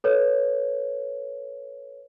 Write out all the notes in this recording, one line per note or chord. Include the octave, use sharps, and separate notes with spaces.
A4 B4 C#5